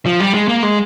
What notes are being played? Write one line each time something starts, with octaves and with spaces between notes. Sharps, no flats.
F3
G3
G#3
A#3
G#3